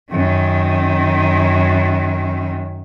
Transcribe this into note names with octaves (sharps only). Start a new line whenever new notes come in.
F#2 D#3